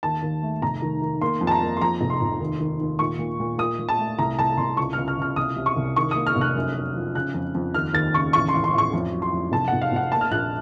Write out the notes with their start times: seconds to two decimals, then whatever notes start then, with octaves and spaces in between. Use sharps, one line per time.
0.03 D#2 A5
0.22 D#2
0.43 A3
0.62 F1 A#5
0.82 D#3
1.02 D#3
1.21 A#3 C6
1.41 F2
1.47 A5
1.51 A#5
1.62 A#3
1.77 C6
1.81 F2 A#5
2.01 F1
2.10 C6
2.21 F1
2.40 D#2
2.60 D#3
2.80 D#2
2.99 A#2 C#6
3.19 A#2
3.40 A#2
3.58 A#2 D#6
3.79 A#2
3.89 A5
3.99 A3
4.19 C2 A#5
4.39 C2 A5
4.58 C2 C6
4.77 C#2 C#6
4.93 C#2 F6
5.08 F6
5.18 C#2 F6
5.36 C2 D#6
5.56 C3
5.66 C#6
5.77 C2
5.96 D#3 C#6
6.11 A#3 D#6
6.27 F6
6.36 F1
6.41 F#6
6.56 F#2
6.75 F#2
6.95 F3
7.15 C#3 F#6
7.34 F2
7.55 F2
7.74 D#2 F6
7.93 D#2 A6
8.14 C#3 C#6
8.33 A1 C#6
8.49 A1 C6
8.64 C6
8.73 A1
8.78 C#6
8.93 F2
9.13 F#3
9.22 C6
9.32 F2
9.52 F1 A5
9.68 F1 F#5
9.82 F5
9.92 F1 F#5
10.12 A#3 A5
10.21 F6
10.31 A#1 F#6